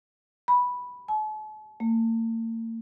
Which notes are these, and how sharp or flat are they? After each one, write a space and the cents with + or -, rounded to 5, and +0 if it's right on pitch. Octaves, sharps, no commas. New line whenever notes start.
B5 -5
A5 -45
A#3 -45